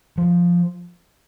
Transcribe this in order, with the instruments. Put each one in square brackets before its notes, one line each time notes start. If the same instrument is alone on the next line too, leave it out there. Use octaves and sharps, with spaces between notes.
[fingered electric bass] F3